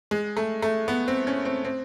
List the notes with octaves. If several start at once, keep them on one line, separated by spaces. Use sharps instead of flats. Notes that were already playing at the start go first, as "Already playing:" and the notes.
G#3
A3
A3
B3
C4
C#4
C4
C4